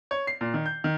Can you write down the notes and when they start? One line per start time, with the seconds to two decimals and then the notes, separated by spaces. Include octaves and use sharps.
0.11 C#5
0.27 C7
0.41 A#2
0.54 D#3
0.66 G6
0.84 D#3